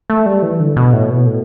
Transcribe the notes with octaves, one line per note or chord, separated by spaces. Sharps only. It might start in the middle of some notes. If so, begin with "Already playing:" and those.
A3
G3
E3
D3
B2
A2
B2
A2